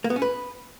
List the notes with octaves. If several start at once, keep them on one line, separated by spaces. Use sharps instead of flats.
A#3
B3
C#4
B4